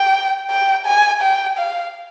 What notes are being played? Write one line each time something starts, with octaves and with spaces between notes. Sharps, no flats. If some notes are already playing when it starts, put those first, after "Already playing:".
Already playing: G5
G5
G#5
G5
F5